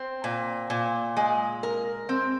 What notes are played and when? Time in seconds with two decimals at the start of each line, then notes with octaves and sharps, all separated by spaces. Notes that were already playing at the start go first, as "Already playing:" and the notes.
Already playing: C4
0.24 A#2
0.70 A#2
1.17 G#3
1.63 A#4
2.09 C4